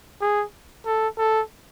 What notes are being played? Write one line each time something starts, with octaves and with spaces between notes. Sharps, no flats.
G#4
A4
A4